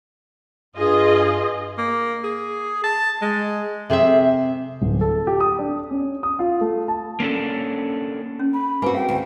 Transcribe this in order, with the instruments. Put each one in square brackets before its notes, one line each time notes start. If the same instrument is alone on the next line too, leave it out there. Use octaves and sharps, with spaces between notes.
[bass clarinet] G2 [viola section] F4 G#4 D#5
[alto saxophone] A#3
G#4
A5
G#3
[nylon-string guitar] C3 G#4 C5 E5
[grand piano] D1
A4
G4
D#6
D4
C#4
D#6
F4
A3
A5
[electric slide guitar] A#3 C#4 D4 A4
[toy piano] C#4
[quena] B5
[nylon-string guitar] A#3 C4 F#4 [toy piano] G#4 B4 G#5
[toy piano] F5 [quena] G5
[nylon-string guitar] D2